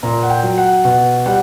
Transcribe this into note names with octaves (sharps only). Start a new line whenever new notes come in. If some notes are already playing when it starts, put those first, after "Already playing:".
A#2 A#5
F#5
G5
F#3
F#5
B2 F#5
G3 F#5